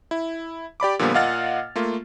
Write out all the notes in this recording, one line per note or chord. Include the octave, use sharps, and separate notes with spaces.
E4
G4 D5 B5 D6
A#2 D3 F3 G3 A#3 B3
A#2 D#5 F5 F#5 F6 A6
A3 A#3 F4